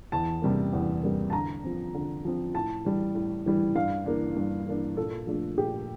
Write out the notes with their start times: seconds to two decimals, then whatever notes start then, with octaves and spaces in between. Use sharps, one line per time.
0.12 E2 A5
0.42 C3 G3 A#3
0.73 E2
1.03 C3 G3 A#3
1.30 A5
1.33 D3 A#5
1.64 F3 C4
1.94 D3
2.25 F3 C4
2.54 A2 A5
2.85 E3 G3
3.15 A2
3.46 E3 G3
3.76 G2 F5
4.06 E3 A#3 D4
4.37 G2
4.66 E3 A#3 D4
4.97 A#2 A4
5.27 F3 A3 D4
5.58 A#2 G4